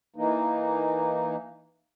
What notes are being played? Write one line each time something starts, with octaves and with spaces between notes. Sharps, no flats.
E3 A#3 D#4